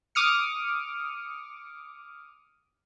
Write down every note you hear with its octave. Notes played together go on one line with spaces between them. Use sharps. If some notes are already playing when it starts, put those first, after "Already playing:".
D6 D#6 F6 C#7